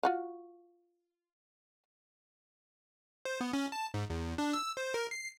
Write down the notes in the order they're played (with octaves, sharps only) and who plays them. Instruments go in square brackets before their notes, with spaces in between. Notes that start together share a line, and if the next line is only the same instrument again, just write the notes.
[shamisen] F4 F#4 F5
[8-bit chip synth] C5
B3
C#4
A5
G#2
E2
D4
E6
C5
A#4
C7